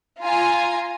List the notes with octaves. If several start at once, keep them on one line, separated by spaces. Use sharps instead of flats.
F4 G#5 A#5